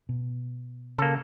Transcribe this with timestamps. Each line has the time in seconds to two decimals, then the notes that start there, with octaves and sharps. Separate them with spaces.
0.09 B2
0.98 C#3 A#3 A4